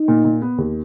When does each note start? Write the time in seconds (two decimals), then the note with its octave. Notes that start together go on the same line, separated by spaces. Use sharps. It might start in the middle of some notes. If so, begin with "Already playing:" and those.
Already playing: D#4
0.08 A#2
0.25 A#2
0.42 B3
0.58 D#2